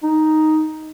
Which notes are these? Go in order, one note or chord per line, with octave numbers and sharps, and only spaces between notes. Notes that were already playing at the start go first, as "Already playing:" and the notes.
D#4